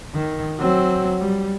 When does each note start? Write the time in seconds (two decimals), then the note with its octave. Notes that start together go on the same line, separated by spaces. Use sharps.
0.14 D#3
0.59 F#3 C4
1.20 G3